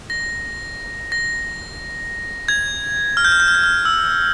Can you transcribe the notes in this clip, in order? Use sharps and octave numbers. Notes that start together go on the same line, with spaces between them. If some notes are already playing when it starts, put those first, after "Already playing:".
A#6
A#6
G#6
F6
G6
F6
G6
F6
G6
F6
E6